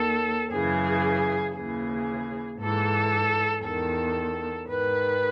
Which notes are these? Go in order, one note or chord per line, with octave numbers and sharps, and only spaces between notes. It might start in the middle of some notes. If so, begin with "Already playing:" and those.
Already playing: D#2 D#3 A4
F#2 C#3 E3 G#4
D#2 C#3 E3 G#4
G#2 E3 A4
E2 D#3 A4
G#2 D#3 B4